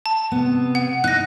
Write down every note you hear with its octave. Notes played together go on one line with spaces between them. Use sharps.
A5
C3 B3
F#5
D#4 F#6 A#6